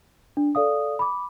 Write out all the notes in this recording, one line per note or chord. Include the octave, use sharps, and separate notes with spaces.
D4
A4 D5 F5 D#6
B5 D6